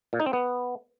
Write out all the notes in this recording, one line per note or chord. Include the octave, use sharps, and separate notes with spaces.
A#2
D#4
C4
B3